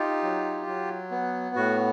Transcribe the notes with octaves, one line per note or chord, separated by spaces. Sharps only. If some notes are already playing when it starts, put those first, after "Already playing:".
Already playing: D#4 F4 G4
F#3
F#3
B3
A2 F#4